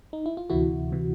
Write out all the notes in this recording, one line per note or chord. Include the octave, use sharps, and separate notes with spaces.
D#4
E4
F4
D2 C3 E3 E4 F#4
C3 E3